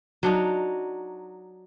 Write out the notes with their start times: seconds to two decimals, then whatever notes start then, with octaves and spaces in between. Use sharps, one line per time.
0.23 F#3 D4 D#4